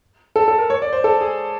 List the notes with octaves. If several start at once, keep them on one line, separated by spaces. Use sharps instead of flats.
A4
A4
A#4
C#5
D5
C5
A4
G#4